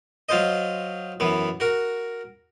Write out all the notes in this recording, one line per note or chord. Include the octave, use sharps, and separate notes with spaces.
F#3 F4 C5 D#5
F#2 E3 B3
F#4 A#4